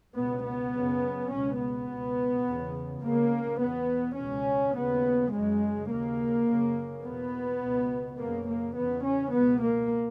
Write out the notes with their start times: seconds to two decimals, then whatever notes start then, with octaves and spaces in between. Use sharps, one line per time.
0.15 C#2 B2 B3
0.44 B3
0.72 F#2 C#3
1.30 C#2 B2 C#4
1.59 B3
1.87 C#2 B2
2.45 E2 C#3
3.02 C#2 C#3 A#3
3.59 E2 B2 B3
4.17 C#2 B2 C#4
4.74 D#2 C#3 B3
5.31 F#2 C#3 G#3
5.89 D#2 C#3 A#3
6.47 F#2 C#3
7.04 E2 B2 B3
7.61 C#2 B2
8.18 F#2 C#3 A#3
8.47 A#3
8.76 E2 C#3 B3
9.04 C#4
9.33 C#2 B2 B3
9.62 A#3